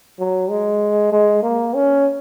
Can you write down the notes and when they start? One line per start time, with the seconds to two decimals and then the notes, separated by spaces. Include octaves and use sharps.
0.19 F#3
0.50 G#3
1.12 G#3
1.43 A#3
1.74 C#4